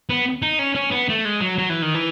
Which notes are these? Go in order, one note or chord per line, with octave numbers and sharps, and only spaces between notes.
B3
D#4
C#4
C#4
B3
A3
G#3
F#3
F#3
E3
D#3
E3